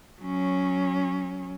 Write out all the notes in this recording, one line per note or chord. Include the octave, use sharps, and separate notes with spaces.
F#3 C#4